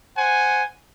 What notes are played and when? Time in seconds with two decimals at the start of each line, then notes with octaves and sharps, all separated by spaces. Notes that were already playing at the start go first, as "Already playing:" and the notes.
0.16 C5 F#5 G#5